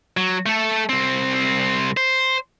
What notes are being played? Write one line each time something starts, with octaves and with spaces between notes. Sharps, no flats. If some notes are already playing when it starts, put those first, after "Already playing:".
F#3
A3 A4
C2 C4
C5